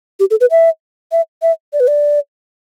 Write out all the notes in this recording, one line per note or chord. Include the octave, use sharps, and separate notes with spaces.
G4
A4
B4
E5
E5
E5
D5
B4
D5